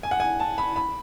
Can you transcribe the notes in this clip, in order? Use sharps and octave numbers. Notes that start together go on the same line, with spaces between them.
G#5
F#5
G#5
A5
B5
B5